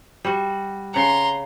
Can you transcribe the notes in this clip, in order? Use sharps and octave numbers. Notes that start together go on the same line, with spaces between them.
G3 F#4
C#3 F#5 A#5 C6